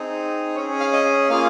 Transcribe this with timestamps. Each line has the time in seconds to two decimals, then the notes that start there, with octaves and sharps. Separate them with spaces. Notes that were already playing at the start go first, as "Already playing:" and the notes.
Already playing: C4 D#4 G#4
0.55 C#4 G#4 C#5
0.80 F5
0.93 D#5
1.30 A#3 F4 G#4 F5